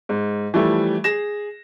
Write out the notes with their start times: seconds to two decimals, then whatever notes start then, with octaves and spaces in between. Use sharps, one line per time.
0.09 G#2
0.54 E3 F3 G3 A3
1.04 G#4 A#6 E7